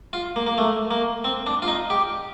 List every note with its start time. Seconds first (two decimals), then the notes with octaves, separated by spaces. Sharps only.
0.13 F4
0.36 A#3
0.47 A#3
0.58 A3
0.91 A#3
1.24 C4
1.46 D4
1.62 F4
1.68 D#4
1.90 G4